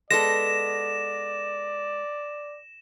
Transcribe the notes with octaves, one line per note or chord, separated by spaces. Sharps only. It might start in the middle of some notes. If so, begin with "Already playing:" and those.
G#3 B3 A4 D5 A#6 E7